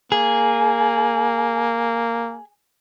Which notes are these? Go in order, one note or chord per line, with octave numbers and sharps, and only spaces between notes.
A#3 G#4